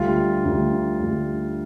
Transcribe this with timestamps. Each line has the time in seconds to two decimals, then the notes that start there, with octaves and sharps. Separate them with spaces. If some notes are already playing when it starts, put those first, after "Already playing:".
Already playing: D2 D3 G3 F4
0.44 D2 D3 G3
0.99 D2 D3 G3